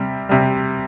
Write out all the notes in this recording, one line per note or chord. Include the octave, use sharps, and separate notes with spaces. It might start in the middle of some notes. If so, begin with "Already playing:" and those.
Already playing: C3 G3
C3 G3